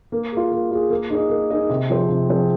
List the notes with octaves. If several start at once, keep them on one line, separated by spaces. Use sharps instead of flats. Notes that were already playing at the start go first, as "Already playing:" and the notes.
A#3
F4 G#4
A#3
F4 G#4
A#3
D#4 G#4 D#5
A#3
D#4 G#4 D#5
C3
F3 C4 G#4 C5
C3
F3 C4 G#4 C5